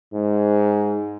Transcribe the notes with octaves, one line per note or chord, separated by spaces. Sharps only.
G#2